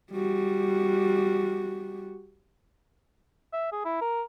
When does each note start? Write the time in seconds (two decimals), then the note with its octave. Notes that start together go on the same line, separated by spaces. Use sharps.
0.12 G3 F#4
3.53 E5
3.72 G#4
3.85 E4
4.01 A#4